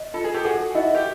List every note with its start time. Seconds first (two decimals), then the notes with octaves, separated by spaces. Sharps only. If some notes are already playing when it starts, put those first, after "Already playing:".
Already playing: D#5
0.14 F4 A4
0.24 G#4
0.34 G4 A4
0.45 F#4 G#4 A4
0.75 E4 F#4 D#5
0.95 G4